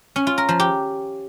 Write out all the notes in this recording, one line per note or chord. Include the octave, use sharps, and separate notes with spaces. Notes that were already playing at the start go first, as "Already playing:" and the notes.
C#4
F4
A#4
F3
G4